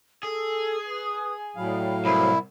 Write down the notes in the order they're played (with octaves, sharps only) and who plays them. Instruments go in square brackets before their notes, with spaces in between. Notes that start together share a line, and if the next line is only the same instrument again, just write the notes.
[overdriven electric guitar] G#4 [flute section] A4 E6
[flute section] B4 D#6
[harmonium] A2 F#3 F5 [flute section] D5 G5 B5
[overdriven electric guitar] C2 [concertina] E4 [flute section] C5